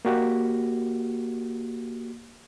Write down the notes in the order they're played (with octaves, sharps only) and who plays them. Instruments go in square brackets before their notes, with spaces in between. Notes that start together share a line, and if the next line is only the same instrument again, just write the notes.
[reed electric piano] A#3 F#4 G4